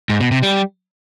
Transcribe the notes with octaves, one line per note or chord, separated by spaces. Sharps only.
G#2
B2
C3
G3